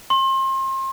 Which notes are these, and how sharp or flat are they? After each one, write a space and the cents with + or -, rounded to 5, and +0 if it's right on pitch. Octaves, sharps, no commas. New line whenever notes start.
C6 +35